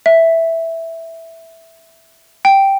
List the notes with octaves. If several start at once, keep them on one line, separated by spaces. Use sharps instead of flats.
E5
G5